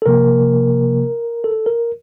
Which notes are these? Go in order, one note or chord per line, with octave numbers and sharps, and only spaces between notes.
A4
C3 F3 A#3 A#4
A4
A#4